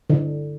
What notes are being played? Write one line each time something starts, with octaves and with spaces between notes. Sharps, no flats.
D3